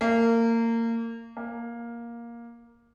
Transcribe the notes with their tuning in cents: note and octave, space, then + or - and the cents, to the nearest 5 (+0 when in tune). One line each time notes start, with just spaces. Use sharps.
A#3 -25
A#3 +10